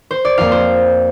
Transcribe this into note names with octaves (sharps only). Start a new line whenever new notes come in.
C5
D5
F2 F3 A#3 F4 F5
C5